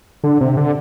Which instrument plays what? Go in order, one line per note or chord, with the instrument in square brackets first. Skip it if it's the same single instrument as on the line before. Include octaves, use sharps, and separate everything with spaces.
[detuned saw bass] D3
C3
D3